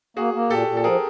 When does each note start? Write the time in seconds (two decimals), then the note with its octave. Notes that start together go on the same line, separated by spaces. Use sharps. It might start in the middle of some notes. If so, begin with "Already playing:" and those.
0.17 A#3 F#4 G#4
0.34 A#3
0.50 A#2 G4 A4
0.68 A#2
0.77 A4
0.83 F3 G#4 A#4